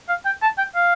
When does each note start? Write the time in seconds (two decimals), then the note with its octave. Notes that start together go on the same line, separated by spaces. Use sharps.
0.09 F5
0.25 G5
0.42 A5
0.58 G5
0.75 F5